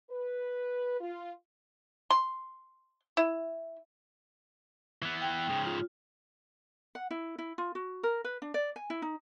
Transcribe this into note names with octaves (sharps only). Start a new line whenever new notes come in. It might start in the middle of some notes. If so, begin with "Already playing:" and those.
B4
F4
C6
E4
E3 B3
G5
G#2 C#3
F4
F#5
E4
E4
F4
F#4
A#4
B4
D4
D5
G#5
E4
D#4